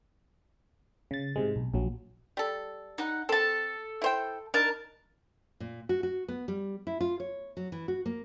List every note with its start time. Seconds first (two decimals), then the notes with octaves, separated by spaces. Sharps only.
1.11 C#3 A6
1.36 G#2 C3 G#3
1.56 B1
1.74 A#1 F#3
2.37 G3 A4
2.98 D#4 F#5
3.29 C4 A4 A5
4.02 E4 C5 G5
4.54 D4 D#4 A#4 A5
5.60 A#2
5.89 F#4
6.03 F#4
6.28 B3
6.48 G3
6.87 E4
7.01 F4
7.20 C#5
7.57 F#3
7.72 E3
7.88 F#4
8.06 A#3